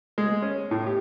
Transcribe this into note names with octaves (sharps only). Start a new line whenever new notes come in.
G#3
C#4
A2
G4